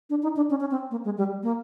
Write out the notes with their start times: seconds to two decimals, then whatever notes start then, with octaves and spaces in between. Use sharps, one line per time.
0.10 D4
0.23 D#4
0.36 D4
0.50 C#4
0.60 C#4
0.71 C4
0.91 A#3
1.05 G#3
1.18 G3
1.43 A#3